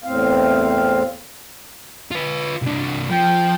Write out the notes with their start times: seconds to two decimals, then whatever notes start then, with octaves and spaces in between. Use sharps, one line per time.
0.04 E2 A2 C4 F5
2.11 F4 B4
2.62 C2 D4
3.10 F3 G5